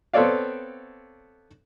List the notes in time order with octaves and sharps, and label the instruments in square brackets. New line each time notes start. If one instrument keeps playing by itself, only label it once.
[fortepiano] B3 C4 A4 C#5 D5 F5